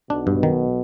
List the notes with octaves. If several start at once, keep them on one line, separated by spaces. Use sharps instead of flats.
B1 B2 D4
G2
D#3